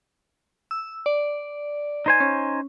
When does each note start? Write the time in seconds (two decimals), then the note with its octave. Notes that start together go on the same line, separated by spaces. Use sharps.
0.71 E6
1.06 D5
2.06 D#4 C5 G#5
2.20 C#4